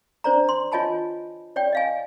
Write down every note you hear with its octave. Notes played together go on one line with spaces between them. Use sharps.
D4 C5 D5 A#5
C6
F4 C#5 D#5 G#5 A5 B5
C#5 D5 G5
D#5 F5 G#5